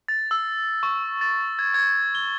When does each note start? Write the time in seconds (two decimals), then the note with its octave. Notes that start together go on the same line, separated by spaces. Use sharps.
0.08 A6
0.31 E6
0.83 C#6
1.21 A6
1.59 G#6
1.74 G#6
2.15 G7